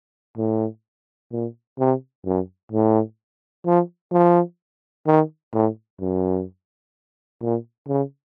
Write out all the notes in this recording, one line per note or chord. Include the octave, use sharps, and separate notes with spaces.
A2
A#2
C3
F#2
A2
F3
F3
D#3
A2
F#2
A#2
C#3